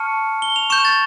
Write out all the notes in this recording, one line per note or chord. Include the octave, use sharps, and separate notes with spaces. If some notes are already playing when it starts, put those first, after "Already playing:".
Already playing: A5 C#6 F6 C#7
G7
F7
C#6 G6 E7
A6